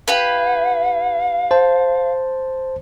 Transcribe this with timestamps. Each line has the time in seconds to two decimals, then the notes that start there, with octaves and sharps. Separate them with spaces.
0.08 E4 G4 B4 F5
1.51 C5 A5